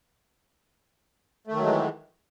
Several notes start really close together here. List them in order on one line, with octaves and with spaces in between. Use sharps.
A3 D#3 F#3 G#3 E3